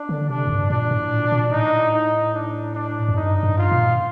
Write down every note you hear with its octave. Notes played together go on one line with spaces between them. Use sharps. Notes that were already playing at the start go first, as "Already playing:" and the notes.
Already playing: D4
D3
C3 D4
F2
G2
A#2 D4
A2
A#2
A#2
A2 D#4
D#4
D4
D4
F2
G2 D#4
G2
F4
A#2